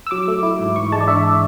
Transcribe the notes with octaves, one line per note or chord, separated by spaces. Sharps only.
E6
F#3 D6
A3
E4
G#2
E3 C#6
G#3 A5
D5
D4 E5